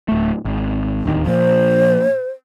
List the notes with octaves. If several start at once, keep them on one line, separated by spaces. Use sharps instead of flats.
D1 A3
G#1
D1 D#2 D#3
A#2 F3 C5